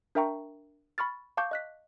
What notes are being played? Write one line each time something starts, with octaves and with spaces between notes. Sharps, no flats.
D4 A#4 E5 G5 A#5 C#6
B5 C#6 F6 A6
F5 A5 C#6 D6 G6
D#5 F#6 B6